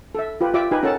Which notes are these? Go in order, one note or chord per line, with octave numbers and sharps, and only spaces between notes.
A4 E5
F4 G4 B4
F4 G4 D5 E5 D6
D#4 G4 B4 G#5
C#4 A4 A#4 F#5 A5